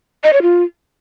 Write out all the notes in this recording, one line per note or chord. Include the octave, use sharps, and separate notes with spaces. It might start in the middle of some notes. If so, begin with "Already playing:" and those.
D#5
C#5
F4